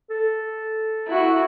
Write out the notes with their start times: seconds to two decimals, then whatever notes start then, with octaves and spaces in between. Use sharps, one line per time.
0.10 A4
1.08 E4 F#4